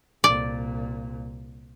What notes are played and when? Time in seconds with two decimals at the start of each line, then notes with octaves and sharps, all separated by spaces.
0.24 C2 A#2 D5